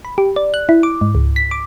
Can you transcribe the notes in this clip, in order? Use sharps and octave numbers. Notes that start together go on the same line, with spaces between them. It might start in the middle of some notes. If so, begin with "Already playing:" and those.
B5
G4
D5
F#6
E4
D6
G#2
C#2
B6
D6